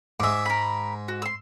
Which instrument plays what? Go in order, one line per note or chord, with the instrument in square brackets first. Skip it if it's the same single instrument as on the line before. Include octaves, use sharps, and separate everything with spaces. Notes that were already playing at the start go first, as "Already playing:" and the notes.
[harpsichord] G#2 G#3 [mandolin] E5 D6
[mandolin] A#4 B5
F#4
C6 E6